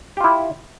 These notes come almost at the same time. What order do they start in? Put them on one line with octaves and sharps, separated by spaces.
G4 F4 E4